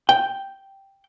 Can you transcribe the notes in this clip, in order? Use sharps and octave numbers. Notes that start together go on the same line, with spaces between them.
G5